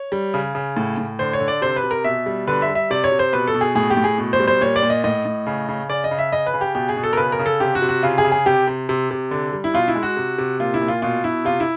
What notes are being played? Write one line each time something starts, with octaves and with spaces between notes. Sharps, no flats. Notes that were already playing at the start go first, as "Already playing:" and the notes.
Already playing: C#5
G3
C#3
C#3
A2
A2
D3 C5
C#5
D3
D5
C3 C5
B4
C3
A#4
B2 E5
G3
D3 B4
E5
G3
E5
C3 D5
C#5
C3
C5
B2 B4
A4
B2
G#4
A2 G#4
G4
A2
G#4
B2
C5
G3
C5
A#2 C#5
D5
A#2
D#5
A2 D#5
A2
C#3
C#3
C#3 D5
D#5
C#3
E5
C#3 D#5
B4
C#3
G4
B2 G4
G#4
B2
A4
A#4
C#3 B4
A#4
C#3
A4
C3 G4
F#4
C3
F#4
C#3 F4
G#4
C#3
G#4
C3 G4
C3
C3
C3
D3
G3
E4
B2 F4
E4
G#3
F#4
C3
C3
A#2 F4
E4
A#2
F4
B2 F4
B2 E4
C3 F4
E4